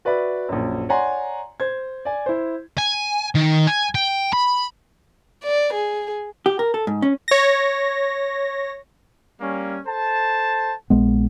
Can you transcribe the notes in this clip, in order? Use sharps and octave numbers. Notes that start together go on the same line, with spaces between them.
F#4 B4 D5 E5 B5
A#1 F#2
C#5 D5 F#5 G#5 A#5 C6
C5 G#6
D5 G#5
E4 C5
G#5
D#3
G#5
G5
B5
D5
G#4
G4
A#4
A4
G#2
C#4
C#5 A#6
G3 A#3 C#4
A4 C5 A5
A#1 G#3 B3